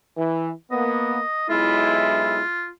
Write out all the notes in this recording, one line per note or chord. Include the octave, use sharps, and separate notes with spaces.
E3
A#3 B3 D#5
B1 G#3 E4 F4